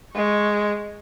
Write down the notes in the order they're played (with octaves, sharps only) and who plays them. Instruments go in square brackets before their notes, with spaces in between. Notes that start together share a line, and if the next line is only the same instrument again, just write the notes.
[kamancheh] G#3 C#6